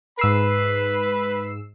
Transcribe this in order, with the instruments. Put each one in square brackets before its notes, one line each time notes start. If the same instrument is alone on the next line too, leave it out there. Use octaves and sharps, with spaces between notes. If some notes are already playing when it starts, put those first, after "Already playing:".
[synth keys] G#2 E6 C7 [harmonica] B4 B5